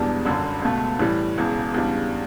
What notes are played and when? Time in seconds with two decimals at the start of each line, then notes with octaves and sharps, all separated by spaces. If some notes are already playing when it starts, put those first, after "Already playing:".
Already playing: E1 E2 B2 G3 D4
0.25 G1 F#2 D3
0.62 C#2 B2 A3
0.99 A2 E3 G3
1.38 E1 E2 C#3
1.74 E2 C#3 G3 D4